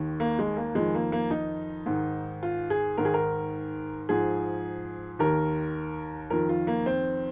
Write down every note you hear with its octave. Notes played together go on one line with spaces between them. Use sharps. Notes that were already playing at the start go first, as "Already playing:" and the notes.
Already playing: D#2 D#3
A#3
G#3
A#3
F2 D#3 G#3
A#3
A#3
D#4
G#2 D#3
F4
G#4
G#2 D#3 A#4
G#4
A#4
G#2 F3 G#4
D#2 D#3 A#4
F2 D#3 A#4
F4
A#3
C4